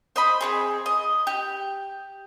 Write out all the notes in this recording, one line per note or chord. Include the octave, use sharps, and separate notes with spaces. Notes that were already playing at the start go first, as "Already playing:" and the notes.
C5 D#5 B5
C4 F#4 G#4
D#5
G4